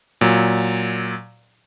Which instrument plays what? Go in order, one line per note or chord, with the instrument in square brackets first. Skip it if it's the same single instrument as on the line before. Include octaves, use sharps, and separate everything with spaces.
[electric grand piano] A#2 F#3